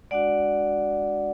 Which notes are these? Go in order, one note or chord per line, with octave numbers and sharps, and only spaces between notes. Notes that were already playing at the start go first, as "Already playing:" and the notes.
G#3 D4 F#4 D5 F#5